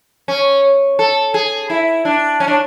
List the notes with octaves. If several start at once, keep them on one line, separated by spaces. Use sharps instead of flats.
C#4
A4
G#4
E4
D4
C#4
D4